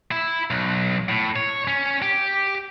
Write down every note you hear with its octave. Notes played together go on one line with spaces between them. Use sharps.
E4
B1
A2
C#5
C#4
G4